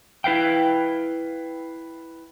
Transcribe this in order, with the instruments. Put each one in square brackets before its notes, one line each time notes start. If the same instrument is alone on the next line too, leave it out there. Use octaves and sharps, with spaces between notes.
[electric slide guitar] E4 B4 F5 G5